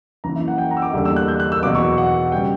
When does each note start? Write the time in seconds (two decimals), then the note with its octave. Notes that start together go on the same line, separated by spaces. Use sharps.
0.24 F#2 E3 A#3 A#5
0.36 E5
0.48 F#5
0.58 G5
0.71 A#5
0.77 E6
0.82 D6
0.93 E2 D3 G3 A#3
1.05 E6
1.16 F#6
1.28 G6
1.40 F#6
1.52 E6
1.62 E2 B2 F#3 B3 D6
1.75 C#6
1.98 F#5
2.32 C#3 G3 G5